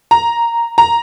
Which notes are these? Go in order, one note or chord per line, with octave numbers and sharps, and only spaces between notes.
A#5
A#5